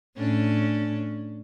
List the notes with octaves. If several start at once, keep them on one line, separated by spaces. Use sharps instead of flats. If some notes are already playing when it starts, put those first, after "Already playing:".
A2 C#4 D4